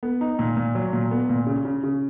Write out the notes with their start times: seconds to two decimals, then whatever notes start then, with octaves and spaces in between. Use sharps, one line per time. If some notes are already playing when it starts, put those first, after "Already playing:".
0.03 B3
0.21 D#4
0.39 A#2
0.57 A#2
0.75 F#3
0.93 A#2
1.11 B3
1.29 A#2
1.47 C#3
1.65 C#3
1.84 C#3